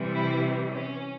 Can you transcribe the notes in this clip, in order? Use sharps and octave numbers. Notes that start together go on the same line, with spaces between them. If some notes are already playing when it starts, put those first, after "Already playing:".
Already playing: C3 E3 G3
E4
C#4